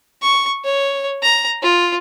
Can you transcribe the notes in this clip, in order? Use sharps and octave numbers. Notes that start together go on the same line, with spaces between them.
C#6
C#5
A#5
F4